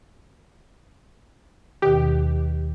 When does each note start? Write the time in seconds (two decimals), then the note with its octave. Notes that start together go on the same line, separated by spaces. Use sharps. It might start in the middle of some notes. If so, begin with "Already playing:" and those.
1.82 D#2 B2 D#3 G4